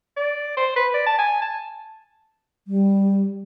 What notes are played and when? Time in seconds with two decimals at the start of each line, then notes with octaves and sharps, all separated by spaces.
0.17 D5
0.57 C5
0.76 B4
0.94 D5
1.07 A5
1.19 G#5
1.42 A5
2.68 G3